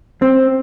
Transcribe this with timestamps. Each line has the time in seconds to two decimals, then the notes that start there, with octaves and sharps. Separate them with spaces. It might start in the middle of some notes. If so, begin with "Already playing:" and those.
0.22 C4